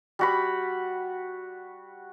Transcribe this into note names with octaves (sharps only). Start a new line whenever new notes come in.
G3 F#4 B5